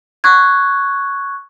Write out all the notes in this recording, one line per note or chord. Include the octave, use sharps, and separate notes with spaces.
C#6 F#6 G#6